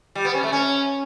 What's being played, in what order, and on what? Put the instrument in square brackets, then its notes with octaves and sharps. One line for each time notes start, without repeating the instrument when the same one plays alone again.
[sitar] G3
B3
C#4
A3
C#4